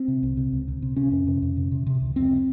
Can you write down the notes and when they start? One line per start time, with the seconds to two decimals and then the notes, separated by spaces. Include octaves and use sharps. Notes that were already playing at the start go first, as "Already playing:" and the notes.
Already playing: C4
0.08 C3
0.23 C2
0.37 C3
0.53 C#2
0.68 C3
0.82 C3
0.96 C3 C#4
1.11 F2
1.27 C3
1.42 F2
1.57 C3
1.72 C3
1.87 C3
2.02 C#2
2.16 F2 C4